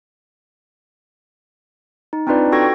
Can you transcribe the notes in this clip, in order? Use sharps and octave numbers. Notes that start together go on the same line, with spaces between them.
D#4
C4 D4 D#4 F4 B4 D5
F#4 A4 G5 C#6 G#6 A#6